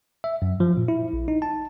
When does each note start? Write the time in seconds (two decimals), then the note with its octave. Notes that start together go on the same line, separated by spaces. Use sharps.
0.24 E5
0.42 F#2
0.60 F3
0.77 A#2
0.88 E4
1.13 A#1
1.28 D#4
1.42 A5